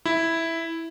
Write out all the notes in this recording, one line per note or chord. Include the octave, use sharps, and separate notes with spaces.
E4